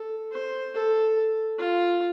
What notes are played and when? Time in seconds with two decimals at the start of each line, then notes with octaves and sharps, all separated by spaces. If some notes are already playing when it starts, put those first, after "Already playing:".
Already playing: A4
0.32 C5
0.74 A4
1.58 F4